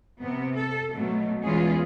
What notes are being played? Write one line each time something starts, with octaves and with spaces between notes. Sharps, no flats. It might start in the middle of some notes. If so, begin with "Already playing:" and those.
C3 B3
A4
B2 F#3 A3
E2 E3 G#3 C#4 F4 G#4